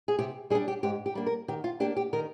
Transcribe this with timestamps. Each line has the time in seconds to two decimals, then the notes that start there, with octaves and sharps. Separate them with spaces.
0.08 G#4
0.19 C3 G4
0.50 G3 G#4
0.55 D4
0.68 G4
0.83 G#2 G4
1.06 G4
1.15 G3 A#3 D4
1.26 A#4
1.48 D#3 G4
1.64 F4
1.80 A#3 D4 G4
1.97 G4
2.13 D#3 A#4